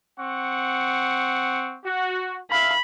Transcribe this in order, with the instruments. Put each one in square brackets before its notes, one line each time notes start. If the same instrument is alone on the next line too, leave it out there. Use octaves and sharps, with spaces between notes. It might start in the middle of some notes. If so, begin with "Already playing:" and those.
[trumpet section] C4 F#5 C#6
F#4
[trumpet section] E5 F5 [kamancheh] B5